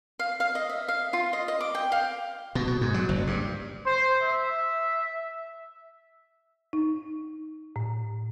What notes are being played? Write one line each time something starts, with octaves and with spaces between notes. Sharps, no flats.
F5
F5
D#5
E5
F5
F4
D#5
D#5
D6
G5
F5
B2
B2
G#2
F#3
F#1
G2
C5
E5
D#4
A2